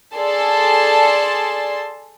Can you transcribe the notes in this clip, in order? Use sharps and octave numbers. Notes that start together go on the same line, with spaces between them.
G#4 A4 D5 A5 C6